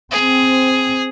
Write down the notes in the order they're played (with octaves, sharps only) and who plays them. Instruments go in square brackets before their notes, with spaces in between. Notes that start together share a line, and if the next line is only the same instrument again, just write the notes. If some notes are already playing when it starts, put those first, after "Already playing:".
[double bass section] C4 [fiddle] G#4